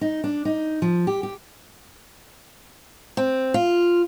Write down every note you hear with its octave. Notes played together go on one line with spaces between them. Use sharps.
D#4
D4
D#4
F3
G4
G4
C4
F4